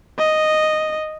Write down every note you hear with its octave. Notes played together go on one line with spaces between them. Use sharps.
D#5